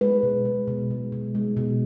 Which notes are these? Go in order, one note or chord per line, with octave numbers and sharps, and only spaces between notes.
G#3 B4
B2
G#3
B2
G#3
B2
G#3
B2